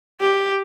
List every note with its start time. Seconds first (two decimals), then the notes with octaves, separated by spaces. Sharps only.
0.21 G4